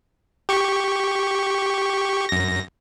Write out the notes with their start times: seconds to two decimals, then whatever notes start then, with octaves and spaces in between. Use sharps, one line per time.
0.49 G4 C#6
2.29 F#2 A#6